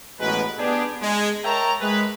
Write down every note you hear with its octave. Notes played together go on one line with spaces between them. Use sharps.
A1 B2 G#3 F#4 A#4 B4
B3 D4 G4 G#4
G#3
A#4 C#5 E5 G5 A5 A#5
G#3 B4